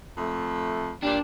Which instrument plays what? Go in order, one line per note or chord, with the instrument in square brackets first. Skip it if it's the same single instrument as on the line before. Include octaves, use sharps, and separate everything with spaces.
[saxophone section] F2 A3
[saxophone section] A#2 G3 [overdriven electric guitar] D4